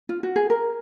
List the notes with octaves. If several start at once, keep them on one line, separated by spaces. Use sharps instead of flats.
F4
F#4
G#4
A#4